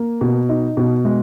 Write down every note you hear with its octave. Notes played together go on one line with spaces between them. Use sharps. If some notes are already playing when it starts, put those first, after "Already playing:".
Already playing: A#3
B2
D#4
B2
G#3